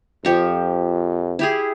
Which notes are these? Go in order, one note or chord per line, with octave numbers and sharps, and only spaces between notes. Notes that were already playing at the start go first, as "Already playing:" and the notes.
F2 F3 G4 C#6
E4 G4 G#4